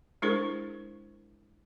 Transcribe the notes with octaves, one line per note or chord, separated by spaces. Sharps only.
G#3 D4 E4 G#4 A#4 C5